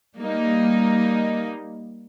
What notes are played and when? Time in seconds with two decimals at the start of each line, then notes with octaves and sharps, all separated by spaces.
0.17 G3 A#3 D#4